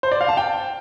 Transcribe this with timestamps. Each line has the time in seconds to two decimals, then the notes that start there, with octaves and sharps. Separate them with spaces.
0.03 C5
0.11 D5
0.21 F5
0.28 A5
0.37 G5